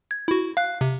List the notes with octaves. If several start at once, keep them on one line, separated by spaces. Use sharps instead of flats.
G#6
E4 F#4
F5 F#6
C3